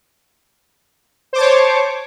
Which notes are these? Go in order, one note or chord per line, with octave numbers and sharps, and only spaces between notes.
C5 C#5 A5 D6